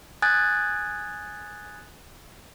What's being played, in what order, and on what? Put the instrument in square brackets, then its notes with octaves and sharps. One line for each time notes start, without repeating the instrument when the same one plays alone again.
[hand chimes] G#5 D#6 F#6 G#6 A6